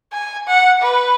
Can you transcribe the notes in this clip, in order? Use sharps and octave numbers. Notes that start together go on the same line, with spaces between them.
G#5
F#5
B4